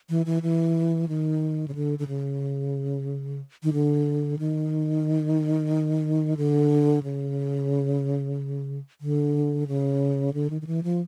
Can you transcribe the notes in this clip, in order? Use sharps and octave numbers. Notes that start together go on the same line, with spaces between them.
E3
E3
E3
D#3
C#3
D3
D3
C#3
D#3
D3
D#3
D3
C#3
D3
C#3
D3
D#3
D#3
E3
F3